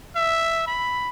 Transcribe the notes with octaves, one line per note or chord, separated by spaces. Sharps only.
E5
B5